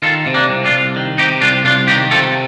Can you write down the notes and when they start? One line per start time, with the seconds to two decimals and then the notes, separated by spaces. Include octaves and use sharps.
0.02 D#3 F4 A4
0.26 C3
0.34 A#3 D4
0.49 C2
0.64 D4 F4
0.72 C2
0.96 D#3
1.18 C3 D#4 G4
1.41 C2 D4 F4
1.65 C2 D4 F4
1.88 D#3 D#4 G4
2.11 C3 F4 A4